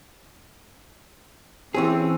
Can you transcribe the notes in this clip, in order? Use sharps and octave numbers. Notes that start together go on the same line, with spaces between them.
E3 C4 C#4 G#4